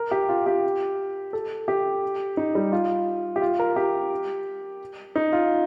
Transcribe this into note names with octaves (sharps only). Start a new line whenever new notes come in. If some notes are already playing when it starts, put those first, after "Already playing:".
Already playing: A#4
G4
F4
G4
A4
G4
D#4
G3
F4
G4
F4
A#4
G4
D#4
F4